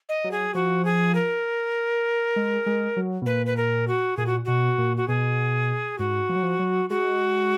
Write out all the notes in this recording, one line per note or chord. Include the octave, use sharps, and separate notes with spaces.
D#5
F#3
G#4
F3 F#4
G#4
A#4
G#3
G#3
F#3
B2
A#2 B4
B4
A#4
F#4
A#2 G#4
F#4
B2 F#4
A#2
F#4
B2 G#4
G#2 F#4
F3
F#3
F3
F#3
G#3 F#4